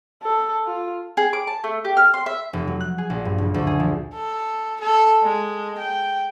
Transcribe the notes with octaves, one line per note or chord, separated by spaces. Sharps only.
A4
F4
G#4
D6
A5
A3
G4
F6
C6
E5
F1
F#3
F#6
G#4
A#1
G2
F#1
D2
G#4
F3
A4
A4
G#3
G5